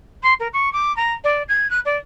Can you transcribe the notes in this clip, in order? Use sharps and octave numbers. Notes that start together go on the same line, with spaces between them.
C6
A#4
C#6
D6
A#5
D5
G#6
F#6
D5